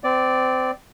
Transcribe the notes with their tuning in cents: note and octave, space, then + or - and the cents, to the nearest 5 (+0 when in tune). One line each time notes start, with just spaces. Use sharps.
C4 -25 D5 +0